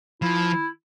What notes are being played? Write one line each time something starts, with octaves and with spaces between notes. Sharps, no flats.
F3 E4